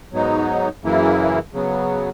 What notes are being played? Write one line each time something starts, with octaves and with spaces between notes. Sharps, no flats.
G#2 F#3 B3 D#4
F#2 C#3 E3 A#3 E4
C#3 F#3 B3